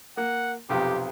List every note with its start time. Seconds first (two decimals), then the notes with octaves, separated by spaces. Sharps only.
0.17 A#3 F#5
0.69 B1 F2 C3 G4